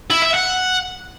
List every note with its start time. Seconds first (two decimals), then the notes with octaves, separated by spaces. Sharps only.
0.11 E4
0.22 E5
0.34 F#5